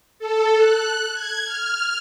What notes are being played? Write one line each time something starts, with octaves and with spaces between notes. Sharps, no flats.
A4
F#6
G#6
F6